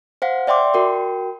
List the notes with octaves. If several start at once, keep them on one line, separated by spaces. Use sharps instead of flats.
C5 F5 F#5
D5 E5 G5 C6 D6
F#4 A#4 G5